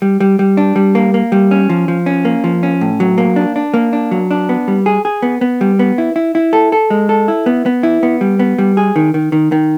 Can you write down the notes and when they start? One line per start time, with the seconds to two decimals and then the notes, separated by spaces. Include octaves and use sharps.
0.02 G3
0.20 G3
0.39 G3
0.57 D4
0.76 G3
0.95 A#3
1.14 A#3
1.32 G3
1.51 C#4
1.70 F3
1.88 F3
2.06 C#4
2.25 A#3
2.44 F3
2.63 C#4
2.81 A2
3.00 F#3
3.18 A#3
3.36 D4
3.56 D4
3.74 A#3
3.93 D4
4.11 F#3
4.31 D4
4.49 B3
4.68 G3
4.86 G#4
5.05 G#4
5.22 B3
5.41 B3
5.61 G3
5.79 B3
5.98 E4
6.16 E4
6.35 E4
6.53 A4
6.72 A4
6.90 G#3
7.09 A4
7.28 E4
7.46 B3
7.66 B3
7.83 E4
8.03 B3
8.21 G3
8.39 B3
8.58 G3
8.77 G#4
8.96 D#3
9.14 D#3
9.32 D#3
9.52 D#3